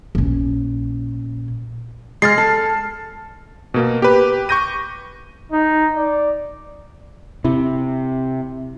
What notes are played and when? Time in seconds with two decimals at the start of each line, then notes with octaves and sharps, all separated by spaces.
0.15 A#1 C#4
2.22 G#3 F6 A6 C7
2.38 A4
3.74 B2 A#3
4.02 G4 B4
4.49 C#6 D6 G6 A#6 D#7
5.52 D#4
5.96 D5
7.45 C3 E4